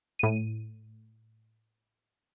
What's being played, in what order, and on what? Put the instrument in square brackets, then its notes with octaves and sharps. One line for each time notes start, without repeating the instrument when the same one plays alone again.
[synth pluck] A2 D#7